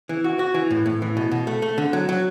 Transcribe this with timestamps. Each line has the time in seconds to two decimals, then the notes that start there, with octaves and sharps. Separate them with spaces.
0.09 E3
0.24 F#4
0.39 F#4
0.54 E3
0.71 A2
0.86 A2
1.02 E3
1.17 B2
1.31 B2
1.47 A3
1.62 A3
1.78 D3
1.93 F#3
2.09 F#3